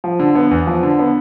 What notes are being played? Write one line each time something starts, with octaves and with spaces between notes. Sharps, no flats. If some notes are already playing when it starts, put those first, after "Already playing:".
F3
D3
B3
E2
F3
D3
B3